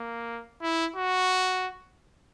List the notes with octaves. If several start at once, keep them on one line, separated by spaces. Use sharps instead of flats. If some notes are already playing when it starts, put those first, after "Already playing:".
Already playing: A#3
E4
F#4